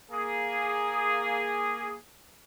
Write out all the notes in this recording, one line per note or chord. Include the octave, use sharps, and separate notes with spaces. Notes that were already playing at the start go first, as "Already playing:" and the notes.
A#3 G#4